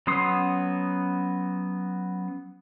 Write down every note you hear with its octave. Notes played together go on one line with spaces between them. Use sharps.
F#3 B3 C#4 C6 D#6